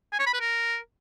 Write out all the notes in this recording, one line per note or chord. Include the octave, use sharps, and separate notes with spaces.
G#5
C#5
B5
B4
A#4